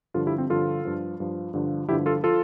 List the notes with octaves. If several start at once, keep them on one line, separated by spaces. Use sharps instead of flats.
G2 D3 F3 F4 A4
E4 G4
C4
G2 D3 F3 F4 A4
G2 F3
G2 F3
G2 D3 F3
G2 D3 F3 E4 G4
F4 A4
F3 F4 A4